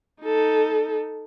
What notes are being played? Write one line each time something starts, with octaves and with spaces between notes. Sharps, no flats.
D#4 A4